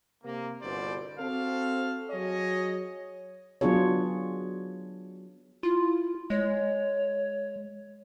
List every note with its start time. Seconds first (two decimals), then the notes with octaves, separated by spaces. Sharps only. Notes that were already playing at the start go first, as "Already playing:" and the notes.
0.24 C3 A#3
0.61 G1 C2 B2 C5 D5
1.18 C4 F#4 A4 F5
2.09 F#3 G#4 C#5 D#5
3.61 F#3 B3 D4 F4 G#4 C#5
5.63 E4 F4
6.30 G#3 C#5